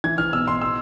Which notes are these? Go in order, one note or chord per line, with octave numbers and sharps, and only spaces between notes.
E3 G#6
E3 F6
B2 E6
B2 C6
B2 E6